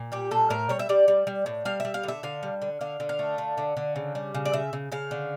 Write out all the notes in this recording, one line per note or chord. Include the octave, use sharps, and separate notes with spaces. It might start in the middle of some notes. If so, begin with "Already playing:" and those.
Already playing: A#2
G3 G4
A#2 A4
A2 A#4
G3 C#5
E5
G3 D5
G3
G3
A2
G3 F5
G3 E5
F5
D3
E5
D3 F5
G3
D3
D3 F5
D3
F5
A3
D3
D3
D3
C#3
G3
C#3
D5
C#3 E5
C#3
C#3 F5
D3